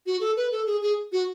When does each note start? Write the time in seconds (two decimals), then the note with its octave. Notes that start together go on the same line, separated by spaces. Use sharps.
0.06 F#4
0.21 A4
0.37 B4
0.52 A4
0.66 G#4
0.82 G#4
1.12 F#4